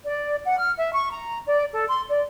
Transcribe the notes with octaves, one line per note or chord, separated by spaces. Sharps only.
D5
F#5
F6
E5
C#6
A#5
D5
A4
C6
D5